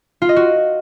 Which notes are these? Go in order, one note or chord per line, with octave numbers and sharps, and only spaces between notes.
F4
D#5
F#4